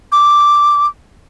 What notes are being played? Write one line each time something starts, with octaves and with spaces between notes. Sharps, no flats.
D6